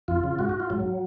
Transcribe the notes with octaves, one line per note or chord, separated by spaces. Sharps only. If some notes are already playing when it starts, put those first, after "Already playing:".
F2 F4
C#3
G#2 F#4
F#4
F4
G#2 F#3